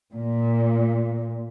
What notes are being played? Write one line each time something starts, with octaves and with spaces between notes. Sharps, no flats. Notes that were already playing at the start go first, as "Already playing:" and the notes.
A#2